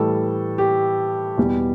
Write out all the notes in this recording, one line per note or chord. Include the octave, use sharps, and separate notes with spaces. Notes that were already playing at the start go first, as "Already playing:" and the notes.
Already playing: A2 E3 G3 A4
G4
E2 B2 G3